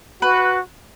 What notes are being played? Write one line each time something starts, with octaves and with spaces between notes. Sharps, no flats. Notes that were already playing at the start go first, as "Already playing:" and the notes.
F#4 B4